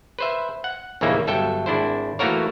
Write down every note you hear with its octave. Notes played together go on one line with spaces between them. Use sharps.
B4 C5 E5
F#5
A#1 D#2 C#3 E3 A#3 E5
G1 F#3 A4 E5 G5
G#1 D4 E4 C5
E3 A3 A#3 F#4 A#4 C#5